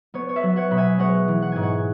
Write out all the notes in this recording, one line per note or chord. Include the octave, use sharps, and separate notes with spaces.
B3 C#5
C#5
B4 E5
F#3
C#5 F#5
B2 B5
E5 G#5
G#3 C#5 F#5
E3
F#5
G#2 G#5
C#5 F#5